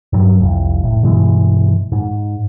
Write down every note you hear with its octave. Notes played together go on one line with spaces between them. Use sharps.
G2 F#3
F1 C2 F2
A2
G2 B2 E3 G#3
G#2